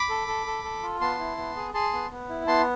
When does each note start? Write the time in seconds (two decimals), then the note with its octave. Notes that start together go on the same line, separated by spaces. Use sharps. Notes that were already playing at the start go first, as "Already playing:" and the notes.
Already playing: B5 D6
0.10 A4
0.27 A4
0.46 A4
0.64 A4
0.83 F4
1.01 B3 A5 C6
1.19 E4
1.38 B3
1.56 G#4
1.74 G#4 A5 C6
1.93 B3
2.11 B3
2.29 E4
2.47 B3 A5 C6